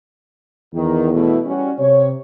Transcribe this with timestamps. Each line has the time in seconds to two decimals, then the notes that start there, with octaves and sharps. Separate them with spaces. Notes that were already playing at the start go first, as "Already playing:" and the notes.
0.74 E2 D#3
1.13 B2 A3 E4
1.46 G3 C#4 F#4
1.79 C3 C#5